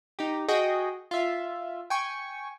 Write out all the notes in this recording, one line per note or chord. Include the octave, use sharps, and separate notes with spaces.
D#4 G4
F#4 G#4 D#5 G5
F4 E5
G5 G#5 C#6